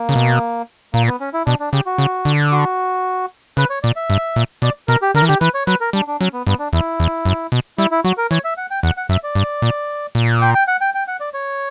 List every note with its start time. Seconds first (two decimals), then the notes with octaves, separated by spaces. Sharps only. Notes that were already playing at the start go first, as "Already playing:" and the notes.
Already playing: A#3
0.09 C#3
0.15 B2
0.94 A#2 A#3
1.07 B3
1.20 C#4
1.34 E4
1.46 B2 D4
1.60 D4
1.72 C#3 G4
1.86 F#4
1.98 C#3
2.25 D3
2.52 F#4
3.57 C#3 B4
3.70 C#5
3.83 A#2 D5
3.96 E5
4.10 G2
4.36 A#2
4.62 B2 D5
4.88 B2 A#4
5.02 G4
5.15 D3 A#4
5.22 E3
5.28 D3 G4
5.41 E3 B4
5.54 C#5
5.67 F#3 B4
5.81 A#4
5.93 G3 D4
6.07 D4
6.20 F#3 C#4
6.33 B3
6.47 G2 B3
6.59 D4
6.73 E2 E4
7.00 E2
7.25 F#2
7.52 B2
7.78 G3 E4
7.91 E4
8.05 F#3 F#4
8.18 A#4
8.31 E3 C#5
8.44 E5
8.57 F#5
8.70 G5
8.83 E2 F#5
8.97 F#5
9.09 F#2 E5
9.24 D5
9.35 G2
9.62 A#2
10.15 A#2
10.41 G5
10.54 G5
10.67 F#5
10.81 G5
10.94 G5
11.08 F#5
11.20 D5
11.34 C#5